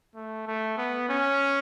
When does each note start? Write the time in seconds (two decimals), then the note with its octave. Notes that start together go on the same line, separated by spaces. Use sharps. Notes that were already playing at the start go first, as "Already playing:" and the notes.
0.15 A3
0.47 A3
0.77 B3
1.09 C#4